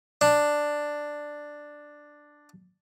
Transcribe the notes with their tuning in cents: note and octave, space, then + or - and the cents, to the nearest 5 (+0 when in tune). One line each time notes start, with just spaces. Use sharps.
D4 +5